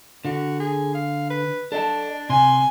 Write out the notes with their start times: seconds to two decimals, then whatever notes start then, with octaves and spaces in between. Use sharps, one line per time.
0.25 D3 F#4
0.60 G#4
0.94 F5
1.30 B4
1.72 D4 A4 D#5 A5
2.30 C3 G#5 C6